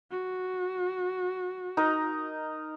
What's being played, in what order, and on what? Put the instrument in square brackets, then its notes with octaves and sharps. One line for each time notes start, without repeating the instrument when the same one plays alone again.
[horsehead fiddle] F#4
[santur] D#4 A#4 D#5